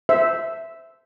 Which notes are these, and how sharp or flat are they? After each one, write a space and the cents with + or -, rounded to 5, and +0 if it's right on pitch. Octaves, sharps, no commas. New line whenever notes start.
C5 -15 E5 +0